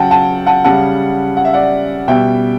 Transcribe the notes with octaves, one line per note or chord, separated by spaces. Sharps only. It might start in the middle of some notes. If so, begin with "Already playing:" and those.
Already playing: C#3 F#3 F#5 G5 A5
F#5 A5
F#5 A5
C#3 G3 F#5 A5
F#5
E5
D5 F#5
B2 G3 E5 G5